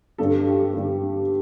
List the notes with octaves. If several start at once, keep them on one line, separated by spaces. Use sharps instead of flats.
G2 D3 G3 A4
G4
G2 D3 G3